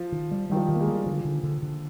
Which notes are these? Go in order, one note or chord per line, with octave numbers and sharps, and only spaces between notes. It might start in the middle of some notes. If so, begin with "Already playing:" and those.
Already playing: F3
D#3
G3
D#3 G3
F3
D#3
A#3
G#3
G3
D3 F3
D3
D3
D3